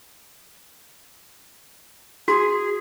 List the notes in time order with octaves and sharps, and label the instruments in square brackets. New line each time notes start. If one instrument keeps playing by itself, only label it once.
[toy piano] F#4 [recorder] G#4